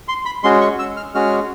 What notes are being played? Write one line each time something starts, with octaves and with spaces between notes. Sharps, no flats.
C6
B5
G#3 C#4 F#4 C6
C#6
E6
F6
G#3 C#4 F#4 F6